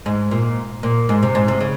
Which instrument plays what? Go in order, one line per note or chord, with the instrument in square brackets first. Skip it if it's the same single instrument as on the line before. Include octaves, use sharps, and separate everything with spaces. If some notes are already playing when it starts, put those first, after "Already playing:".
[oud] G#2
A#2
A#2
G#2
C3
G#2
C3
C#3